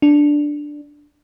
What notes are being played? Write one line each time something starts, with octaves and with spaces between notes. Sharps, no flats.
D4